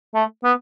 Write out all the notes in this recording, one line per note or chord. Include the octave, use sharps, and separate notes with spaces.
A3
B3